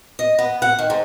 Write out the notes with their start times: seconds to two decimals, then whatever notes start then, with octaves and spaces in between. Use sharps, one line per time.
0.19 D#5
0.39 B3
0.62 F#5
0.79 D#3
0.90 G#2